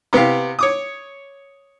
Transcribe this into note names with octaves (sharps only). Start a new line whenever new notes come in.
C3 B3 G4 F5
C#5 D6 D#6